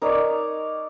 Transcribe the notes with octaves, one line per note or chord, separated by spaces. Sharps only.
D#4 A#4 C#5 D5